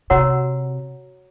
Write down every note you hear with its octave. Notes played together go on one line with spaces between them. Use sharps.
C3 F#4 A#4 C#5 F#5 A#5